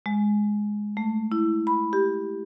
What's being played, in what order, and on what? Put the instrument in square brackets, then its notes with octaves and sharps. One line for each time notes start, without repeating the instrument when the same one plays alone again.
[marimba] G#3
A3
E4
B5
G4